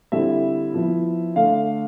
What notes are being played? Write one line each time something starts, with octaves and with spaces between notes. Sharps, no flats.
D3 G3 C4 E4 E5
F3 B3 E4
D3 A3 D4 F5